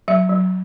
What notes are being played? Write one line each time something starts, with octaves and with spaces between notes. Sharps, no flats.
F#3 E5
F#3